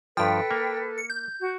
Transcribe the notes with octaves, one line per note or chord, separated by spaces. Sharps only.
G2 F3 A4 B4 G5
A#3
C#7
G6
F#4